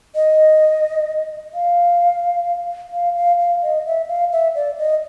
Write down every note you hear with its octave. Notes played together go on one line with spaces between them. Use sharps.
D#5
F5
F5
F5
F5
D#5
E5
F5
E5
D5
D#5